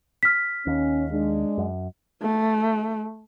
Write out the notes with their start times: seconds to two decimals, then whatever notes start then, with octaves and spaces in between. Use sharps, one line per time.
0.23 F6 B6
0.67 D#2 C#4
1.11 G#3 D4
1.58 F#2
2.21 A3